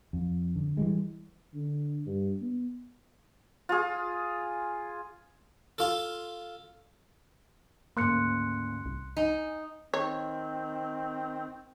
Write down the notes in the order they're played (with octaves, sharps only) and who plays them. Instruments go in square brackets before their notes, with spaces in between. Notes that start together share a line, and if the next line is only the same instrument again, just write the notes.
[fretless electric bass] F2
D3
E3 G3 G#3
[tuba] D3
G2
B3
[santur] F4 G#4
[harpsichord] F4 A4
[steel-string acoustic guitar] D2 G#2 C#3 [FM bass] A#3 [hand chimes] C6 F#6 C#7
[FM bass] C2
[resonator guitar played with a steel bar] D#4 [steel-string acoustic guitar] G#5
[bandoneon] D#3 [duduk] C4 [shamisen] C#5